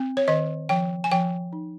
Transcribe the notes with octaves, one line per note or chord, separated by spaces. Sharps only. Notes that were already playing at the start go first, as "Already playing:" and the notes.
Already playing: C4
C#5
D#3 D#5
F3 G5
G#5
F3 G5
D#4